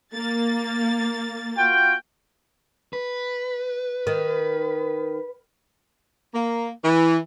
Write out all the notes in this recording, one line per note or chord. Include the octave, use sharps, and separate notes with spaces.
A#3 A6
F4 F#4 G5
B4
D#3
A#3
E3